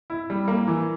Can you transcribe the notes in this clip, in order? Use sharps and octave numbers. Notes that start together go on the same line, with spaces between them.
E4
G3
A#3
E3